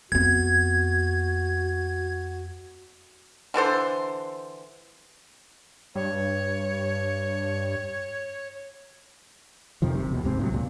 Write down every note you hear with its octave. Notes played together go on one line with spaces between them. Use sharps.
F2 B3 F#4 G#6
D3 E3 A4 C5
G2 C#5
F2 C3 D#3 F3
F#1 C3
D#2 B2
D#1 C2 G#2 C4
A2 C3 F#3
C#2 A#2